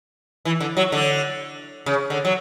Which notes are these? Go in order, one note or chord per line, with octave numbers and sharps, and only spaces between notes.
E3
D3
F#3
D3
C#3
D3
F#3